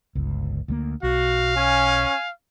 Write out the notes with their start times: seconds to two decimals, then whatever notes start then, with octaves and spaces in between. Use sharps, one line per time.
0.15 G1 C#2
0.68 D2 F#3 A#3
1.03 B1 F#4 F5
1.57 C#4 G#5